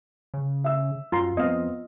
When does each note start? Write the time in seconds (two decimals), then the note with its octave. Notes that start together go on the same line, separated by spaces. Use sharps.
0.34 C#3
0.64 E5 E6
1.12 F#2 F4 A#5 C6
1.37 F2 B3 C4 D#5 F5